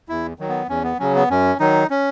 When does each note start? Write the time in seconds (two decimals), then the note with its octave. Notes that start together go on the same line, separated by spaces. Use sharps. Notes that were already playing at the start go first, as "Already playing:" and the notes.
0.09 E2 E4
0.39 D#3 F#3
0.49 B3
0.69 E2 C#4
0.84 B3
0.99 C#3 F#3 C#4
1.15 B3
1.30 F#2 C#4
1.60 D#3 F#3 D#4
1.90 C#4